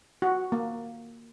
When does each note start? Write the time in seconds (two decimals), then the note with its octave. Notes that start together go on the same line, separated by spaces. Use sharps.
0.22 F#4
0.52 A#3